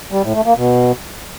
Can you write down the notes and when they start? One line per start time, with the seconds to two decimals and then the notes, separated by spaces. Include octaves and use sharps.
0.12 G3
0.23 A2
0.35 A3
0.46 A#3
0.57 B2